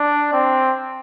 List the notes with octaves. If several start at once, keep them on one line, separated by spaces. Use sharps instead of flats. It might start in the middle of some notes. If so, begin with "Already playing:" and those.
Already playing: D4
C4